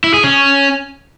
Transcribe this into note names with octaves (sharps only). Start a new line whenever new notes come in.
E4
G#4
C#4